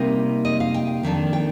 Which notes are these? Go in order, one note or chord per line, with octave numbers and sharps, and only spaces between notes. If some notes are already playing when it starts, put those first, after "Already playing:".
Already playing: C3 G3 A#3 D#4 A#4
D#5
F5
G5
F2 D#3 A#3 D4
G5